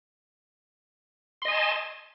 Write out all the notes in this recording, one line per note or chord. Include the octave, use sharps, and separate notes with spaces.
D#5 G#5 A5 C6